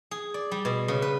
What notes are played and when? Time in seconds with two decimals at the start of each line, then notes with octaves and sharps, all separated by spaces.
0.11 G#4
0.34 D5
0.51 G3
0.65 B2
0.88 C#3
1.02 B4